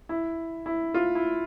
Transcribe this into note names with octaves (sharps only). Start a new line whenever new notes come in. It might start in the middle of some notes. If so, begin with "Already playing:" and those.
E4
E4
F4
E4